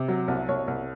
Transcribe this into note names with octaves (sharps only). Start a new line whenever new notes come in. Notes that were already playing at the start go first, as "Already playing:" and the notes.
Already playing: C3
F#3
C2
C2 C#5
C2